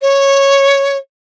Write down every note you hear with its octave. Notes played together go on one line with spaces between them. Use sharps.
C#5